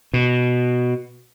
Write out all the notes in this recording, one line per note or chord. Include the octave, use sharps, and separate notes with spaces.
B2